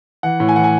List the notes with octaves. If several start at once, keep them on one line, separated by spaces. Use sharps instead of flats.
E3 F#5
A2
G#5
E3 F#5
G#5